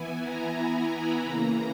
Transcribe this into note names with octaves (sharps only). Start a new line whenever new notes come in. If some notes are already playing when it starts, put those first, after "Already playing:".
Already playing: E3 B3 E4 G#5
A#5
B5
C#3 E3 A#3 A#5